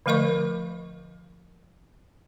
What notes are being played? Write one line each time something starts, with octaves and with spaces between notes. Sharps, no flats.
D3 F3 A3 A#4 D#5 C#6